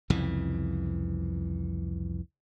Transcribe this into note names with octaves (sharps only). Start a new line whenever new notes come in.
C2 F2 C#3 E3